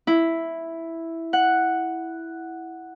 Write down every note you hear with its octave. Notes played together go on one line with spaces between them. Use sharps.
E4
F#5